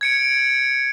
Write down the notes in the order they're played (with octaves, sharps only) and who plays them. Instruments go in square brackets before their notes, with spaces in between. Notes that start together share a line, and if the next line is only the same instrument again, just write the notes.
[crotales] G#6 C#7 D7